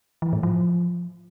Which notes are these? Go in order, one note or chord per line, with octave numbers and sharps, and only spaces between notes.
E3
A2
F3